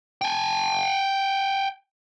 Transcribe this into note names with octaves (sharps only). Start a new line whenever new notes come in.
G5 G#5